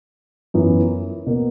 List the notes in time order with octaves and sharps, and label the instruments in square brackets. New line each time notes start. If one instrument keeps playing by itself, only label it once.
[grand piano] F#2 E3 B3
B2 A#3